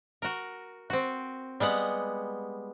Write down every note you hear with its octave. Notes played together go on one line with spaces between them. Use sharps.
F#4 A#4
C4 F#4
G3 G#3 B3 F#5